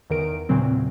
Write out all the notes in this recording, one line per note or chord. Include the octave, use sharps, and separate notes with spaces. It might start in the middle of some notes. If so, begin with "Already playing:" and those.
E2 D#3 A#4 D7
E2 A#2 C#3 F#3 C4